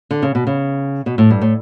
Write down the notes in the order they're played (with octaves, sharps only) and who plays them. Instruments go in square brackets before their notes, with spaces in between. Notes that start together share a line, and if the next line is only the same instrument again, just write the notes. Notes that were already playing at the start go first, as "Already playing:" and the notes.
[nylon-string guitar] D3
C#3
B2
C#3
B2
A2
G2
A2